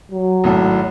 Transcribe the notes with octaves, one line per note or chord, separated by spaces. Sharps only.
F#3
G#1 A2 A4